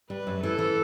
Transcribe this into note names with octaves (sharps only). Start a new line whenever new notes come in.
G3 B4
F#2
E3 A4
E3